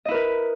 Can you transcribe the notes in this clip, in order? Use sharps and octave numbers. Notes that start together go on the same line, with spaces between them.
E4 A#4 B4 D#5